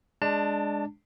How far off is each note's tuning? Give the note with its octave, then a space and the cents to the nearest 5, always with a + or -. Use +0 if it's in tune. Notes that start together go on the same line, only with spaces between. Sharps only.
G#3 +0 D4 +0 A5 +30